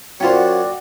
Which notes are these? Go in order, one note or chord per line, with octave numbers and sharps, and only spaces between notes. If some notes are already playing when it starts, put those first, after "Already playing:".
F#2 F#3 C#4 F4 F#4 C5 D5 G5